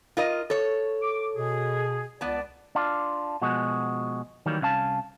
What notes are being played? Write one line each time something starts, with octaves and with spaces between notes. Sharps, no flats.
F4 A#4 D#5
A4 C#5
D6
B2 G#4
C#2 B3 D5 A5
D4 F4
B2 F3 G#3 F#4
D#3 E3 F#3 G3 A#3
C2 C#4 F5 A5